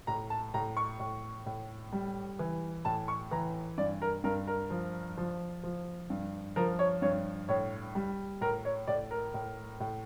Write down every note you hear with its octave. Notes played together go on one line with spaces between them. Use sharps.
A2 A#5
A5
A2 A#5
C#6
A2
A2
G3
E3
A2 A5
C#6
E3 A#5
G2 D5
A#4
G2 A#4
A#4
F3
F3
F3
G2
F3 A#4
C#5
G2 C#5
A2 C#5
G3
A2 A#4
C#5
A2 D5
A#4
A2
A2